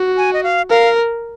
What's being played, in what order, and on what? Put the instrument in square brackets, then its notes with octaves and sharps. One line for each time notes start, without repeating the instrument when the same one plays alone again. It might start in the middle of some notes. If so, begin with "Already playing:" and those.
Already playing: [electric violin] F#4
[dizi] G#5
D#5
F5
[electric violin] A#4 [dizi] F5